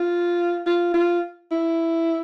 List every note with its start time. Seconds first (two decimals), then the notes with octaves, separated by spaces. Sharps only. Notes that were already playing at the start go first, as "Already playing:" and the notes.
Already playing: F4
0.66 F4
0.94 F4
1.52 E4